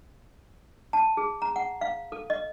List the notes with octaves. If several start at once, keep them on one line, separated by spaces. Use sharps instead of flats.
A5
G#4
A#5
F#5
F5
A4
D#5